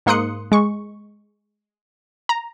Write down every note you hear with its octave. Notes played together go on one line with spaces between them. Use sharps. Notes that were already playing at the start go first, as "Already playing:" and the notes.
G#2 A#3 C6 D#6 F#6 C#7
G#3 C#6
A#5